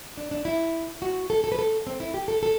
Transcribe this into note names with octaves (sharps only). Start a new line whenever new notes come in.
D4
D4
E4
F#4
A4
A4
B4
A4
C4
E4
G4
A4
A4